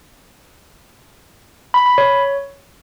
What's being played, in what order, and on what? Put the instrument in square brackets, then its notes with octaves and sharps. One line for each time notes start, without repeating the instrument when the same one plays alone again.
[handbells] B5
B5
C#5